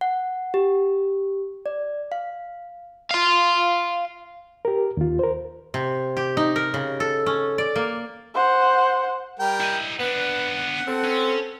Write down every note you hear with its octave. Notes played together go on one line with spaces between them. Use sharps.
F#5
G4
D5
F5
F5 C6
G4 A#4
D#2 F4
A#4 C5
C3
G4
D#4
A#4
C#3
A4
C#4
D5
A#3
C5 F#5
G3 A#4 G5
E4 D#5
B3 D4 B4 F#5
C4 A4
C#4